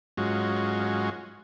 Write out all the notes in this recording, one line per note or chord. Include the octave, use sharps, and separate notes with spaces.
G#2 F#3 G#3 C#4 F4 F#4